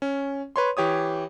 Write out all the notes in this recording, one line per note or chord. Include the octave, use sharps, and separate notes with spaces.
C#4
B4 C#5 C6
E3 G4 C#5 D#6